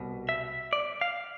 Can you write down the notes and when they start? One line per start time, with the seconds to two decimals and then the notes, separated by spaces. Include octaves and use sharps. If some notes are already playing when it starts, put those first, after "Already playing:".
Already playing: C2 B2
0.29 E5
0.73 D5
1.01 F5